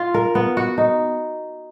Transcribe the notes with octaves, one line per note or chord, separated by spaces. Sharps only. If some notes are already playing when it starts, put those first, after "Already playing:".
Already playing: F4
A#4
B3
F#4
D#4